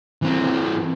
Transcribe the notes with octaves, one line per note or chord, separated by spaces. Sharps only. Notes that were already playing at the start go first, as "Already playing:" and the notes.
E3 C4